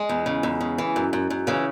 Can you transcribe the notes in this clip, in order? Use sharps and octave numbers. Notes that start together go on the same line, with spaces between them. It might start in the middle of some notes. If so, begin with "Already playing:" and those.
Already playing: G#3
E2
C#3
E2
C#3
E3
F#2
F#2
F#2
C#3 E3